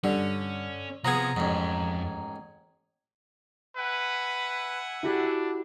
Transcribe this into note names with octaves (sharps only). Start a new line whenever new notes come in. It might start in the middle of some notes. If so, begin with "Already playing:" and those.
G2 D3 C#4
C3 F3 B3 G#4 A#5 G#6
A1 F2 G#2
B4 E5 F#5 G#5
D4 E4 F#4 G4